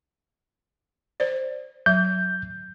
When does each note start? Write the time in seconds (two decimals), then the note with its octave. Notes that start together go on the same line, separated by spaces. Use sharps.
1.20 C5 D5
1.86 F#3 E5 G6